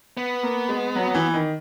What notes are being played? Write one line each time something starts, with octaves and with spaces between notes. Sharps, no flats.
B3
A#3
G#3
F#3
F#3
E3
D#3